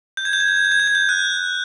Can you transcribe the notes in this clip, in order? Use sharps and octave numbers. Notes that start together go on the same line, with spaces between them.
G6
G#6
G6
G#6
G6
G#6
G6
G#6
G6
G#6
G6
F#6